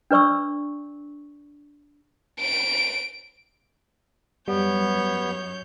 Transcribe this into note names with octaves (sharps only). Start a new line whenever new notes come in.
D4 B4 D5 C#6 E6
D7
F#2 G3 B3 C#5 G6